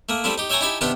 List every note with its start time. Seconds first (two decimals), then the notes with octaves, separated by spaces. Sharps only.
0.09 A3 A#3
0.24 G3 A3 C4 E4
0.38 D#4 G4
0.50 C#5 E5 G5 G#5 A#5 C#6
0.61 D#4 E4 G4 G#5 A5 B5
0.81 C3 D#3 B3 D4 G4 B4